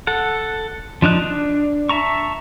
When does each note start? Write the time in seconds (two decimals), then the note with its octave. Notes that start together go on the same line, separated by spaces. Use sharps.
0.07 A4 F#5
1.02 F3 D4 D#4 F#6
1.22 D4
1.89 E5 A5 A#5 C#6